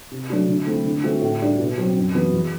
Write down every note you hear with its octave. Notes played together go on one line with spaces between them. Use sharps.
C3
F#3 A3 D4 F#4
D3
A3 C4 E4
D3
A3 C4 F#4
A2
G3 D4 F#4
B2
F#3 C4
F#2
E3 B3 F#4
E2